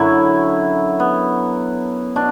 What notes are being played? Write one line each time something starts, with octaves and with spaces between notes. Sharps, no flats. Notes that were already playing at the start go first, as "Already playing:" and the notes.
Already playing: F#2 D3 F#3 E4
B3
B2 D4